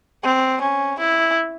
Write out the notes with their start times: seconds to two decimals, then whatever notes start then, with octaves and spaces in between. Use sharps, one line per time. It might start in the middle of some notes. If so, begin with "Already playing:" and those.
0.23 C4
0.61 C#4
1.00 E4